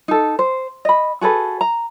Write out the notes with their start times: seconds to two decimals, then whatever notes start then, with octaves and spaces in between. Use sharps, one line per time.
0.08 D#4 A4
0.39 C5
0.85 D#5 B5
1.21 F#4 G#4 A4 B4
1.61 A#5